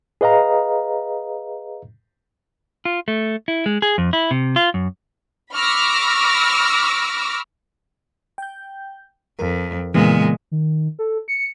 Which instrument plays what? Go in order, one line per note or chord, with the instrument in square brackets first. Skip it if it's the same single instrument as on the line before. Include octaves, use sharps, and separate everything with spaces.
[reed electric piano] G#4 B4 D#5 F5 A#5
[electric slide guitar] F4
A3
E4
G#3
G#4
F2
E4
C3
F4
F#2
[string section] B5 C#6 D6 E6 F6 A#6
[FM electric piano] G5 G6
[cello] F2 [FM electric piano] A#4
[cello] A#2 G#3 [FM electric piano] C#3 E3 B3
[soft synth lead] D#3
A4
C#7